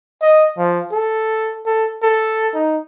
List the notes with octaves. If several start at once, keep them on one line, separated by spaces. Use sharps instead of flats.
D#5
F3
A4
A4
A4
D#4